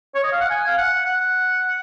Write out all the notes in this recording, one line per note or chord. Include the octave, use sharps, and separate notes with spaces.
C#5
D#5
F5
F#5
G#5
F5
F#5
F#5